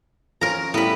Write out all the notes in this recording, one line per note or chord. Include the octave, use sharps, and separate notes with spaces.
F3 C#4 A#4 A#5
A2 G3 B3 B5